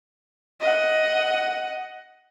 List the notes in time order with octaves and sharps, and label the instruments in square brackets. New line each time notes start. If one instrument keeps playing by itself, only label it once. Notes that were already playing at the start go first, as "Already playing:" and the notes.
[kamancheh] D#5 F#5